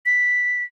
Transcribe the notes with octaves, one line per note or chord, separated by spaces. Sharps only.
B6